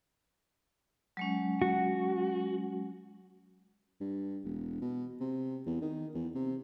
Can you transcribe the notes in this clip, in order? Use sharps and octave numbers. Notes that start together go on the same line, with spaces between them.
F#3 G#3 C#4
F#4
G2
E1
B2
C3
E2
D#3
E2
C3